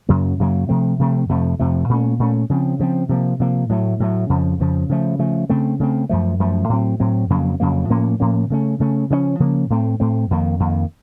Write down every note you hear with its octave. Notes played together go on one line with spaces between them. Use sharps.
F#2 C#3 F#3 A#3
F#2 C#3 F#3 A#3
C3 F3 A3 C4
C3 F3 A3 C4
F2 C3 F3 A3
F2 C3 F3 A3
A#2 A3 C#4
A#2 A3 C#4
C#3 F3 C4
C#3 F3 C4
C3 F3 A#3
C3 F3 A#3
A2 F#3 A3
A2 F#3 A3
F2 C#3 F3
F2 C#3 F3
C#3 F3 A3
C#3 F3 A3
C#3 A3 C4
C#3 A3 C4
F#2 F3 A3
F#2 F3 A3
A2 F#3 C4
A2 F#3 C4
F2 C#3 F#3 A#3
F2 C#3 F#3 A#3
A2 F3 A#3 C#4
A2 F3 A#3 C#4
C#3 A3 C#4
C#3 A3 C#4
C#3 F3 A#3 C#4
C#3 F3 A#3 C#4
A2 A3 C4
A2 A3 C4
F2 D#3 A#3
F2 D#3 A#3